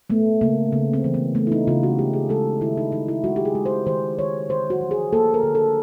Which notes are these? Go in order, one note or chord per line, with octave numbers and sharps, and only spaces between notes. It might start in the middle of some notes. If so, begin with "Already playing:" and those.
A3 B3
C#3 A#3
C#3 B3
C4
E3
B3
A3 B3
E4
D#4
C#3 F4
F#4
G#3 G4
G#4
G#3 A4
D#3 E4
D#4
D#3 D#4
E4
G#3 F#4
G4
G#4
G#3
C5
D#3 C5
D#3 C#5
D3 C5
F#4
F3
G#4
A#3 A4
A#4
D3
A4